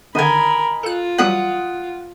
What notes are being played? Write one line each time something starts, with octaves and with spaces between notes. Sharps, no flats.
D3 D#3 A#4 D#5 G#5 B5
F4 A4 F#6
E3 F#3 G3 F#5 D#6